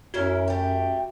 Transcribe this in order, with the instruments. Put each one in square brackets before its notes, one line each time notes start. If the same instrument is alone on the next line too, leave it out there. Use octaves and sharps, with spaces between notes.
[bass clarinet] F#2 [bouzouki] C#4 E4 A#4 [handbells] F#4
[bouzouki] A3 G4